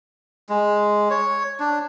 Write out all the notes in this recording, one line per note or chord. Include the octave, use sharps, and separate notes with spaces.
G#3
C#5
D4